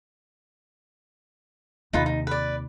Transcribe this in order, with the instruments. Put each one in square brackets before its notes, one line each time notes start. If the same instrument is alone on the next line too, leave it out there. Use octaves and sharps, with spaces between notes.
[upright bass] D#2 C3 [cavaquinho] D#4 F4 B4
[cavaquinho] D#4
B4 D5